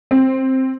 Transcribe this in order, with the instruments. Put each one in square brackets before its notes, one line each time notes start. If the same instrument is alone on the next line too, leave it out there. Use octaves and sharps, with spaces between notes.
[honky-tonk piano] C4